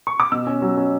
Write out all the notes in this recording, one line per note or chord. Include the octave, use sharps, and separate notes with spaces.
C#6
D6
B2 E6
C#4
F#3
C#4